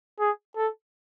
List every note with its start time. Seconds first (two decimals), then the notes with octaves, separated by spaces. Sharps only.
0.19 G#4
0.56 A4